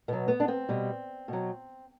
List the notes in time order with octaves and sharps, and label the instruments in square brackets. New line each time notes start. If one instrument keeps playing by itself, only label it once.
[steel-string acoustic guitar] B2 F#3 B3
B3
D4
C4
B2 G3
B2 F#3